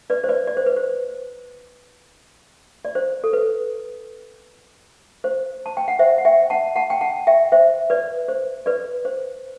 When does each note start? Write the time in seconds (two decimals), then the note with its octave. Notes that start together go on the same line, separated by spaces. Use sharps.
0.10 B4 D5
0.24 C5
0.29 B4 D5
0.47 D5
0.57 C5
0.66 B4
0.77 C5
2.85 D5
2.95 C5
3.24 A4
3.33 B4
5.24 C5
5.66 A5
5.77 G5
5.88 F#5
5.99 C5 E5
6.18 F#5
6.25 E5 G5
6.50 F#5 A5
6.76 F#5 A5
6.90 G5
7.01 F#5 A5
7.27 E5 G5
7.52 C5 E5
7.90 B4 D5
8.28 C5
8.66 B4 D5
9.05 C5